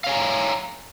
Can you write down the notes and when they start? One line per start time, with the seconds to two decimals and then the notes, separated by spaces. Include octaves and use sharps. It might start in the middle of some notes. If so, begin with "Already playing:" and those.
0.04 F5
0.07 C#5
0.09 G#5
0.12 A#5